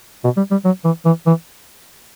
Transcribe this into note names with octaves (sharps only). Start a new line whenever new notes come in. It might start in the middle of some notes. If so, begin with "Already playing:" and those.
B2
G3
G3
F#3
E3
E3
E3